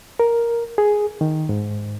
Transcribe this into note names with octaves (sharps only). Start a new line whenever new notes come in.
A#4
G#4
D#3
G#2